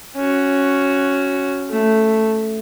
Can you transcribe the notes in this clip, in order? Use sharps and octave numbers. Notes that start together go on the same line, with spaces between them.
C#4 F#4
A3